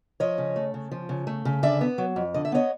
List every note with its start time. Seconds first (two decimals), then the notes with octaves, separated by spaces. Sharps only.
0.20 F3 C#5 D#5
0.38 C#3
0.56 A3
0.74 C#3
0.91 F3
1.09 C#3
1.27 A3
1.45 C#3
1.63 D3 D5 E5
1.81 B3
1.98 F#3
2.16 F2
2.34 D3 D#5
2.45 E5
2.52 B3 C#5 D#5